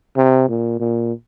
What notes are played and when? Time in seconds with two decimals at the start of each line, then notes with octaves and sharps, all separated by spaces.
0.17 C3
0.49 A#2
0.80 A#2